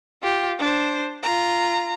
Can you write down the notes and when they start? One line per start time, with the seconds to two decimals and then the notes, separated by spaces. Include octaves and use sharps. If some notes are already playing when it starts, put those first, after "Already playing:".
0.23 F4 G4
0.59 D4 C5
1.23 F4 A#5